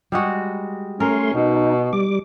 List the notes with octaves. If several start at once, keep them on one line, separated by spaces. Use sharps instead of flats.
G3 G#3 F#4
A3 C#4 A#4 C6
B2 D#4
G3 D6